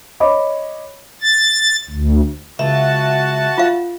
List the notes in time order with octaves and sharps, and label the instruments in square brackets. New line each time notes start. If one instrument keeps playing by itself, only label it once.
[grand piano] C#5 D#5 B5 D6
[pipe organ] A6
D2
[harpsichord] C#2 [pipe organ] F#4 A5 [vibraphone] E5
[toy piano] F4 F5